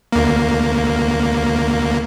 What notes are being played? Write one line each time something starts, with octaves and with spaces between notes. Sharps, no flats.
D2 A#3